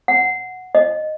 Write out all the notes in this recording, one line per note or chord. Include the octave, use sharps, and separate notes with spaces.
F#5
D#5